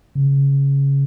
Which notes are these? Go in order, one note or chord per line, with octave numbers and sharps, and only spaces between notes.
C#3